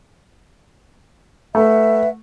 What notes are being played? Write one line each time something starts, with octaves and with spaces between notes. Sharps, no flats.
A3 B4 E5 F#5